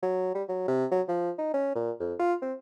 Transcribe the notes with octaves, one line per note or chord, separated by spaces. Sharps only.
F#3
G3
F#3
C3
F#3
F3
D#4
C#4
A#2
F2
F4
C4